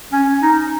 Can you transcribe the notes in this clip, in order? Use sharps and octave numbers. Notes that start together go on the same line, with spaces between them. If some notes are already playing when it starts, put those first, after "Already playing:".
C#4
D#4